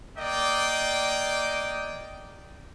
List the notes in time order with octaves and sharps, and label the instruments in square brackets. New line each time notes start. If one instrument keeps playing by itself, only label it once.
[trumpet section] A#3 D5 D#5 G5